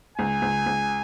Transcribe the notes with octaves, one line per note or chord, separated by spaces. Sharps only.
C#2 G#5
C#2
C#2